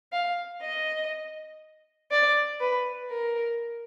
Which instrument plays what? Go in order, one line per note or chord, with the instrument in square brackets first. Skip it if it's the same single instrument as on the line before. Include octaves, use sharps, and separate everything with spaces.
[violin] F5
D#5
D5
B4
A#4